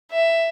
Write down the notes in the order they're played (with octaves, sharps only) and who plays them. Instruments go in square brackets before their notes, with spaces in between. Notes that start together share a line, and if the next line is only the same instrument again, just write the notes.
[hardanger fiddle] E5